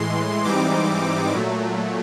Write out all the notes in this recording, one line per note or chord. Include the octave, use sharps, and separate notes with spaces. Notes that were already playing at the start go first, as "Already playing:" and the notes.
Already playing: A2 E3 G#3 C6
G#2 E3 G3 C4 D#4 D6
A#2 F#3 A3